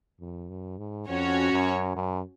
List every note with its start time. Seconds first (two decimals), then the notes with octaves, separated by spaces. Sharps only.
0.20 F2
0.49 F#2
0.78 G#2
1.09 F2 C#4 F#4 C#5
1.52 F#2
1.95 F#2